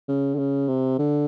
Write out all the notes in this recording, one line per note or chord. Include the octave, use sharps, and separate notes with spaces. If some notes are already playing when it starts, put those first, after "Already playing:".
C#3
D3
C#3
C3
D3